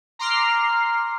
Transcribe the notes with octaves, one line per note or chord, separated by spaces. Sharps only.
A#5 C6 D6 F6 C7